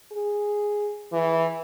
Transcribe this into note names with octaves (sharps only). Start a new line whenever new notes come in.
G#4
E3